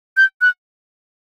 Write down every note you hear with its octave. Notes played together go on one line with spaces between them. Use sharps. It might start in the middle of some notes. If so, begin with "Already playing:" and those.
G6
F#6